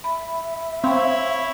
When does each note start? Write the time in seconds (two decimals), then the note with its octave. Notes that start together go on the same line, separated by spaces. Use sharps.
0.04 E5 B5
0.84 C4 E4 C#5 F5 B5